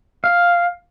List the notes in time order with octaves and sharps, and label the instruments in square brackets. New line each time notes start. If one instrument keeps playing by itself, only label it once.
[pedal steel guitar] F5